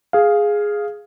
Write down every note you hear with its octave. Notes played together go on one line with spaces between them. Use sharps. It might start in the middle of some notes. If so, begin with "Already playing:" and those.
G#4 F5